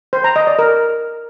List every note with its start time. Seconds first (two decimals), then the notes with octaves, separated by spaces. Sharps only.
0.13 C5
0.24 A#5
0.36 D#5
0.47 D5
0.59 A#4